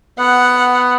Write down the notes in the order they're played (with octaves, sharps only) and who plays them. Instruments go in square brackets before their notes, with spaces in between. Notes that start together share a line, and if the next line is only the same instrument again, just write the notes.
[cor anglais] B3 [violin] F#5